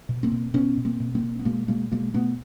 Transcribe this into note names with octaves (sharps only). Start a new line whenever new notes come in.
B2
A#3 C4
B2
B2 B3 C#4
B2
A#3 C4
B2
A#3 C4
B2
B3
B2 G#3 A#3
B2 G#3 A#3
B2 G#3 A#3
B2 A3 B3